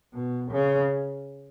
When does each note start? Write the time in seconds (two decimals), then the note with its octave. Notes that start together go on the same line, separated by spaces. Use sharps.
0.14 B2
0.51 C#3